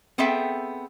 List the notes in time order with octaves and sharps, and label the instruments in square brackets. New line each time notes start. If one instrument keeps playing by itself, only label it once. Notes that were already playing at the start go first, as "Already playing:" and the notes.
[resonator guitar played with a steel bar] B3 C4 G#4 A4 E5 G5